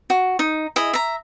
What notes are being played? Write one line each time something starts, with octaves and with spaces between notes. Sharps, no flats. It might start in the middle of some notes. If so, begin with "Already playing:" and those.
F#4
D#4
E4 G#4 D#5
E5 A#5